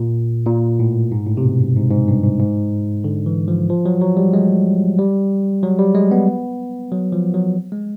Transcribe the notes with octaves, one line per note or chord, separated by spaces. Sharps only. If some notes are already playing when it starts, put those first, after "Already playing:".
Already playing: A#2
A#2
A2
G#2
A2
C3
B2
G2
G#2
G#2
G2
G#2
G#2
D3
E3
F3
F3
F#3
F#3
G3
G#3
G3
F#3
G3
G#3
B3
F#3
F3
F#3
G#3